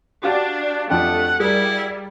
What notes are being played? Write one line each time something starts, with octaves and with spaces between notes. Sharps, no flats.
D4 F#4 G4 F5
F2 A3 D4 F#5 G5
G3 E4 G#4 A#4